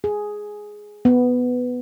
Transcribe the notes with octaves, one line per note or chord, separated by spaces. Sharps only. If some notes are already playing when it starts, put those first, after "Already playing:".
G#4
B3